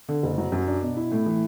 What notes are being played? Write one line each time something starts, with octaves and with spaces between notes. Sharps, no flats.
D3
F#1
F#3
F#2
D4
B2
E4
A2
E3